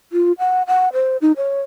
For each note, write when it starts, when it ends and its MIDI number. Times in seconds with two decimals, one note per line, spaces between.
0.12 0.32 65
0.39 0.62 78
0.67 0.89 78
0.93 1.17 72
1.21 1.32 63
1.37 1.61 73